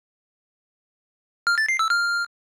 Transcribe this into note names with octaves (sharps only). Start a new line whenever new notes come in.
F6
A6
C7
E6
F6